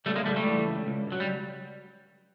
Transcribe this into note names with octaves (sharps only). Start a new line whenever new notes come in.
C#2 G3 A3
G#3 A#3
C#2 G3 A3
G3 A3
E3
C#2
C#2
C#2 F#3
G3